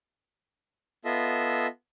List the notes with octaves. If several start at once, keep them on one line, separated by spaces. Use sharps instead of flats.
B3 F4 A4 D#5 E5